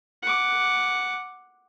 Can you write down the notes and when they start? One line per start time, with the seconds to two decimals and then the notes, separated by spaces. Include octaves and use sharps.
0.23 F#5 D6